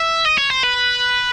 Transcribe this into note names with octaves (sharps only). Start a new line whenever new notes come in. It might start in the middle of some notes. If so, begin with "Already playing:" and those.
Already playing: E5
D#5
C#5
C5
B4